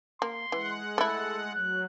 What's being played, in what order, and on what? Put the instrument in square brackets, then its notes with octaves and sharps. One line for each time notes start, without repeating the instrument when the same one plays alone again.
[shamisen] A#3 [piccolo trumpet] C6
[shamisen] E3 [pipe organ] G#3 F#5
[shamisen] A3 E4 [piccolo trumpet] A4
[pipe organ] F#3 [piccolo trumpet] F#6